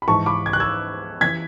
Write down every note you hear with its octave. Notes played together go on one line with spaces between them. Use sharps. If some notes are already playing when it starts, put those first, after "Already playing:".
B5
G#2 E3 A5 C#6
B5 D6
G#6
F#6
E6 G#6
E3 G#6 B6